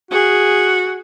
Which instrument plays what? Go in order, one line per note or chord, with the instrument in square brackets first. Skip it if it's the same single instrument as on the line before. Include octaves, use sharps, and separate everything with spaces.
[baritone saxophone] F#4 [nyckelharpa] G#4